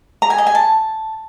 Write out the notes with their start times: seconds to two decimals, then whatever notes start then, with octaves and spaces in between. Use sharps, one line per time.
0.22 A#5
0.30 G#5
0.38 D#5
0.47 G#5
0.55 A5